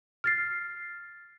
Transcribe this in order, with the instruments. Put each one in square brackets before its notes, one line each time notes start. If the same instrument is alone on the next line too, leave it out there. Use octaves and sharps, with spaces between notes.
[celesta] F6 A6 C7